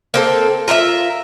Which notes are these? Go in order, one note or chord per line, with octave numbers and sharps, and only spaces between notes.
A#3 C4 A4
F4 A#4 C#5 E5